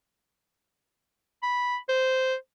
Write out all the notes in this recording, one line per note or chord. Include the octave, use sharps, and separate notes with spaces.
B5
C5